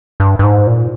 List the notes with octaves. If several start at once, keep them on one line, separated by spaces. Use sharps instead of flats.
G2
G2
G#2
A#2